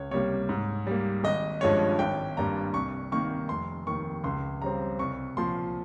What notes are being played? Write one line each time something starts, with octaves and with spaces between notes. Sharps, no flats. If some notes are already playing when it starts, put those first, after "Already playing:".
Already playing: C#2 C#5
C3 G3 A#3 C#5
G#2
G3 A#3
G#1 D#5
G2 F3 G#3 C#4 C#5
G#1 G5
G2 G3 A#3 A#5
C2 C#6
C3 D#3 A#3 D#4 C#6
F1 C6
D#2 D#3 C#6
C#2 C6
C#3 G3 C4 A#5
C2 C#6
A#2 F3 C6